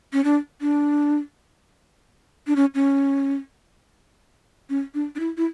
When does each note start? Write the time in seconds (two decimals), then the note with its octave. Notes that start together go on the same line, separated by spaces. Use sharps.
0.13 C#4
0.24 D4
0.61 D4
2.47 D4
2.56 C#4
2.75 C#4
4.70 C#4
4.94 D4
5.16 D4
5.20 E4
5.37 E4